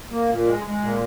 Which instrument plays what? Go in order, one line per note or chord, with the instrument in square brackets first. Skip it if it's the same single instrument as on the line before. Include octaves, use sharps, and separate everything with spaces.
[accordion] A#3
A#2
G#3
G#3
A#2